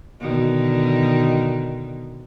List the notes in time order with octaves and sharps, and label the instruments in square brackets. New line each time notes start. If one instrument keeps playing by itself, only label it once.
[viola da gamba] B2 D3 D#3